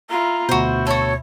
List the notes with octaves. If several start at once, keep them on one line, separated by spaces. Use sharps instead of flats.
E4 F4 A#5
D2 B2 E4 F#4 C5
F#4 A4 C#5